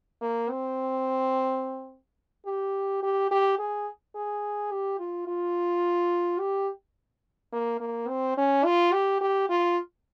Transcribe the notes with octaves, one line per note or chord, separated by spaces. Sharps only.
A#3
C4
G4
G4
G4
G#4
G#4
G4
F4
F4
G4
A#3
A#3
C4
C#4
F4
G4
G4
F4